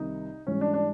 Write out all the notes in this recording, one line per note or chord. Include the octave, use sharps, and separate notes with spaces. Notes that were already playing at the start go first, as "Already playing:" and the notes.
Already playing: C2 C3 D#3 D#4
G#2 E3 G3 C#4
D4
D4